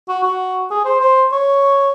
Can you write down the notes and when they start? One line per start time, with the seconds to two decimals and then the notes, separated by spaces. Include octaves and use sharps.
0.09 F#4
0.23 F#4
0.70 G#4
0.85 C5
1.00 C5
1.32 C#5